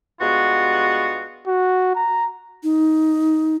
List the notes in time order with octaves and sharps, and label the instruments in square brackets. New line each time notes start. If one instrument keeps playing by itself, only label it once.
[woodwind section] G2 G#3 B3 F4 F#4
[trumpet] F#4
A#5
[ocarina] D#4